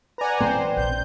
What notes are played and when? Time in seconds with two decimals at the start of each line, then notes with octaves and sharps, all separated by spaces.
0.18 B4 D5 F#5 G#5 A#5
0.40 E3 C4 C5
0.77 A#1 G6